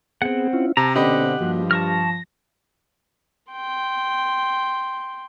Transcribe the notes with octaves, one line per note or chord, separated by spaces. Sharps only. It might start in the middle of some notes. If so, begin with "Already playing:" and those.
B3 C4 G#4 F#5
C#4 E4 F4
C3 A5 A#5
B2 D3 C4 C#4 G4 D#5 F#5 B5
G2 F3 A#3 F#4
A5 C#6 F6 A#6
G5 C6